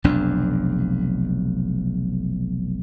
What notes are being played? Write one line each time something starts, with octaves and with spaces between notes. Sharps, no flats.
F1 B1 F2 D4